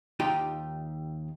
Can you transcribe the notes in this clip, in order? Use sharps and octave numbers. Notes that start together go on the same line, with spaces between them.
D#2 D#4 F4 G4 G5